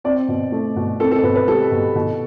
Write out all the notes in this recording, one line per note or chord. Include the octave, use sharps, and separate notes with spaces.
C4 D5
B2
A3
B2
C4 A4
A4
B2 B4
B4
G3 A4
B2
B2